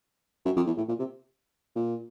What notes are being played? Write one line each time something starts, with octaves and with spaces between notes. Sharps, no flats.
F#2
F2
E2
A2
A#2
C3
A#2